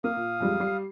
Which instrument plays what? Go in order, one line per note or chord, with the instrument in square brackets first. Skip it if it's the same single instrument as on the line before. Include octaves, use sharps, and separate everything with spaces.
[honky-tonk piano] A#3 [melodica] F5 D#6
[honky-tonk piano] A#2
F2 G3 G#3
G3 C7